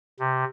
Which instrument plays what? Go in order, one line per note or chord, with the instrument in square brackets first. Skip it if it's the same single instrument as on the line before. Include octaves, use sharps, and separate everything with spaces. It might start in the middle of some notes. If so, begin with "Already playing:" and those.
[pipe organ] C3